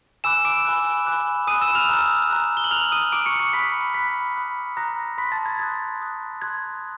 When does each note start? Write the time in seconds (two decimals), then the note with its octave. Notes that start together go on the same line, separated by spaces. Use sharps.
0.24 G#5 B5 D6 E6 F#6 E7
0.45 D6 D7
0.65 G#5 B5 D6 F#6
1.07 G#5 B5 D6 F#6
1.47 G#5 B5 D6 D#6 F#6 D#7
1.61 E6 E7
1.75 F6 F7
1.89 A#5 D#6 F#6
2.30 A#5 D#6 F#6
2.57 G7
2.64 F#7
2.71 A#5 D#6 F6 F#6 F7
2.92 D#6 D#7
3.12 A#5 D6 D#6 F#6 D7
3.26 C#6 C#7
3.40 C#6 C#7
3.53 B5 D#6 F#6 B6
3.94 B5 D#6 F#6 B6
4.36 B5 D#6 F#6
4.77 A#5 B5 D#6 F#6 A#6
5.18 B5 C6 D#6 F#6 B6
5.32 A5 A6
5.46 G#6
5.59 C6 D#6 F#6 G#6
6.00 C6 D#6 F#6
6.42 C6 D#6 F#6 G#6